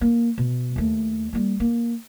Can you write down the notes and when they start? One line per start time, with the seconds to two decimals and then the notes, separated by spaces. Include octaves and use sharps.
0.01 A#3
0.38 B2
0.76 D#2 A3
1.33 G3 A#3
1.60 A#3